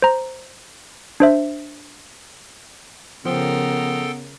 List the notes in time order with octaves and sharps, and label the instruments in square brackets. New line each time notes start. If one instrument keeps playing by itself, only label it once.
[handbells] C5 A#5
D4 C5 E5
[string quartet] C#3 A#4 [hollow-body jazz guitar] F3 [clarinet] B3 [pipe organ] A4 G5 C6